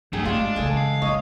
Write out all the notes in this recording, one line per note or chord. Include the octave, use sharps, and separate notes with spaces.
G1 D2 F#3 A3 G#4 G5
G#3 A3 D4 F4 G4
C#3 E3 G#3 G#4 A4
F5
G#3 C#5 D#5